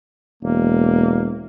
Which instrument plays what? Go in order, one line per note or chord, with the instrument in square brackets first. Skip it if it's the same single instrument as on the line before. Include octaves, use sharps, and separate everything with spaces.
[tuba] E1 [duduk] A#3